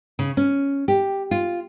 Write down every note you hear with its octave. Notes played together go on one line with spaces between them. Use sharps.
C#3
C#4
G4
F4